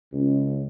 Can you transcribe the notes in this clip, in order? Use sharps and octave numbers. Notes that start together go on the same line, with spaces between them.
C#2